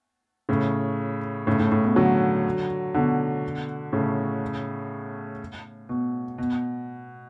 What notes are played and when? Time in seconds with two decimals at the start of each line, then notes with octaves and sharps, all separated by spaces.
0.49 A2 C#3
1.47 A2 C#3
1.59 A2
1.72 A2
1.84 B2
1.96 D3 F#3
2.94 B2 D3
3.92 A2 C#3
5.89 B2
6.38 B2